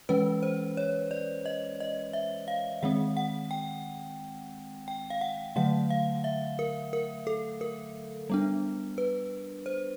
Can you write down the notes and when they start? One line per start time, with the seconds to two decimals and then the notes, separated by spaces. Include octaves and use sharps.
0.09 E3 G#3 C#4 B4
0.43 C5
0.77 C#5
1.11 D5
1.46 D#5
1.80 D#5
2.13 E5
2.48 F5
2.83 D#3 G#3 C4 F#5
3.17 F#5
3.51 G5
4.88 G5
5.10 F5
5.21 F#5
5.56 D3 F#3 A3 F#5
5.90 F5
6.24 E5
6.59 A#4
6.93 A#4
7.27 A4
7.61 A#4
8.30 G3 B3 D4
8.98 B4
9.66 C5